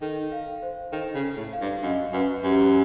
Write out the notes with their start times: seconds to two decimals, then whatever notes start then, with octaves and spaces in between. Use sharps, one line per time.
0.02 D#3 A4
0.32 F5
0.62 C5
0.92 D#3 A4
1.15 C#3
1.23 A4
1.37 A2
1.53 F5
1.61 G2
1.83 F#2 D#5
2.13 F#2 B4
2.44 F#2 G4